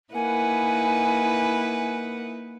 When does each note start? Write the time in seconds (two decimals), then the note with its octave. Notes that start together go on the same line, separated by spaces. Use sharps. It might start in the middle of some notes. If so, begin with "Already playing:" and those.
0.14 A#3 D#4 E4 B4 F#5 G#5